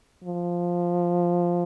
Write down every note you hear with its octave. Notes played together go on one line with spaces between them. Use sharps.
F3